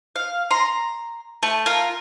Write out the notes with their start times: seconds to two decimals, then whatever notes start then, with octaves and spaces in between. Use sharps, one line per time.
0.16 F5
0.51 A#5 C6
1.43 A3 A5
1.66 F4 A#4